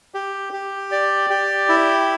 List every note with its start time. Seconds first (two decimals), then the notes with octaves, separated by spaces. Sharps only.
0.14 G4
0.53 G4
0.92 D5
1.30 G4
1.69 E4